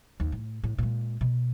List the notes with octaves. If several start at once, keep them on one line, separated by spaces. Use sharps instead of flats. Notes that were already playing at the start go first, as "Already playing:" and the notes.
D#2
A2
A2
A#2 G#3
B2